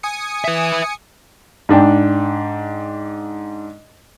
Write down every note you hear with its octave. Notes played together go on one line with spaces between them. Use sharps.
G#5 D#6 C#7
B4 E5
G#2 D4 G5